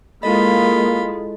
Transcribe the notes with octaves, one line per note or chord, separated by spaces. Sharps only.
G#3 A#3 E4 F4 A4 D#5 B5